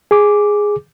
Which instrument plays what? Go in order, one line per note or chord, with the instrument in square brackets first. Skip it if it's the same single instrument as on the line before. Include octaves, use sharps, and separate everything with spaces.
[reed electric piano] G#4 D6